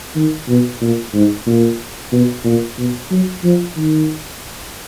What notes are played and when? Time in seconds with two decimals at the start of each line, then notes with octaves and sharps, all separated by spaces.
0.15 D#3
0.48 B2
0.81 A#2
1.14 G#2
1.47 A#2
2.12 B2
2.45 A#2
2.78 B2
3.11 F#3
3.44 F3
3.76 D#3